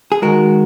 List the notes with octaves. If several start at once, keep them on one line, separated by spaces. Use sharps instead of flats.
G#4
D#3 G#3 F#4 A#4